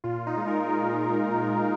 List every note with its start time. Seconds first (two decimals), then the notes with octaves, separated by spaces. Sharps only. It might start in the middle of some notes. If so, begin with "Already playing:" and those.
0.04 A#2 F4
0.27 D#4
0.37 G#3
0.47 A#4
0.69 A#2